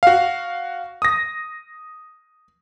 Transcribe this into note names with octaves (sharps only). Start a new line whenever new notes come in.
F#4 F5
D#6 A#6